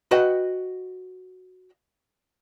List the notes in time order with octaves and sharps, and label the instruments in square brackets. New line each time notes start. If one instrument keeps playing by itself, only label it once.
[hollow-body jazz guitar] F#4 B4 D#5 F#5 G5